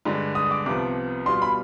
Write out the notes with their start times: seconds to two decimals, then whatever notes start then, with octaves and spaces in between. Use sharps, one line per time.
0.05 G2 D3 G#3 D4
0.35 D#6
0.51 D6
0.66 C2 C3 F3 B3 D6
1.26 B2 G3 D4 F4 C6
1.42 B5